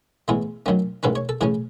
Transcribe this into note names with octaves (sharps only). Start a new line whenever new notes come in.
A2 E3 G#3 B3 G#4
F#2 D#3 F#3 A3 C#4
A1 G#2 D#3 G#3 C#4 B4
C#5
A4
A2 E3 A3 C#4 G#4